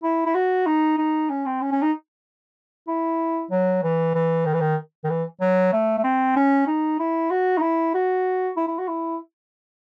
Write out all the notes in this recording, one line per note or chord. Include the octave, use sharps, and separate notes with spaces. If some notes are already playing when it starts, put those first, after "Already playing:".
E4
E4
F#4
D#4
D#4
C#4
C4
C#4
C#4
D#4
E4
F#3
E3
E3
D#3
E3
D#3
D#3
E3
F#3
A3
A3
C4
C#4
D#4
E4
F#4
D#4
E4
F#4
E4
E4
F#4
E4